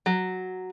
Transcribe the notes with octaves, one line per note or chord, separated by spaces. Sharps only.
F#3